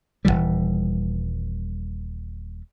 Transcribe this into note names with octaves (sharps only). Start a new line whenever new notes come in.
D#1 D2 E3 G3